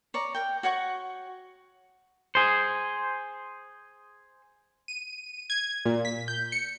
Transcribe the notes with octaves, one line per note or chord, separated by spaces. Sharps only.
C#5 D5 A#5
A#4 G5
F#4 C#5 F#5 C#6
G#4 C5
D#7
G#6
A#2
B6
G6
C#7